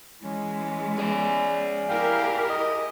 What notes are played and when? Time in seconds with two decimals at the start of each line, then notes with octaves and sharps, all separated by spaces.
0.23 E3 G#3 C#4
0.98 G#4 D5
1.89 E4 G4 A#4 F5 G5
2.50 D#5